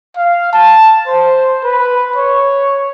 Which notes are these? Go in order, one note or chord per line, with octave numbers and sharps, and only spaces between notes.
F5
A5
C5
B4
C#5